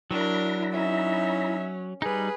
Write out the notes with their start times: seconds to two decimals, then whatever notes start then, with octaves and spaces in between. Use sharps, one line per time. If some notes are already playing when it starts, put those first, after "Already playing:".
0.11 F#3 D4 E4 A#4 A#5 B5
0.74 C#4 D#4 E5
2.02 G3 D#4 G#4 B4